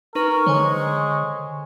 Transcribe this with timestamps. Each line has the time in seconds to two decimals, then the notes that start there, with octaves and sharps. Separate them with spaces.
0.15 D#4 A#4 B4 C#6
0.46 D3 G#3 C5 C#5 G#5